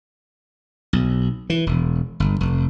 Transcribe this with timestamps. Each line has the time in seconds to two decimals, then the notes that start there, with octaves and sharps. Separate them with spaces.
0.93 B1
1.50 E3
1.66 E1
2.20 G1
2.40 F1